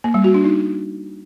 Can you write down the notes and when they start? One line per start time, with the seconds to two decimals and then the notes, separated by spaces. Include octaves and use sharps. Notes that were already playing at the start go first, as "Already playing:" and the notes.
0.04 A#3
0.14 G3
0.24 F#4
0.34 D4
0.44 D#4